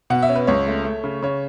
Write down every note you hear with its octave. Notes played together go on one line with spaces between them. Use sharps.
B2 F#5
E5
C#4
B4
C#2 C#5
A3
A3
C#3
C#3 C#5